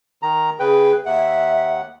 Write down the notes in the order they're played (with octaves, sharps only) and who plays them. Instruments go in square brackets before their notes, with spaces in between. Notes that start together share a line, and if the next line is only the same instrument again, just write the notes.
[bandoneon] D#3 A#5
[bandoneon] C#3 B4 G5 [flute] G#4
[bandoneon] D#2 F#5 [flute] E5